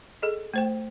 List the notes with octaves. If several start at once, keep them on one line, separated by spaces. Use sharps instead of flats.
G#4 A4 D#5
A3 C5 G5